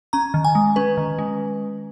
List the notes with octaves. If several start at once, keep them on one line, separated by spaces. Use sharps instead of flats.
C#4 A#5
D#3
G#5
G#3
C#4 B4
D#3
G#3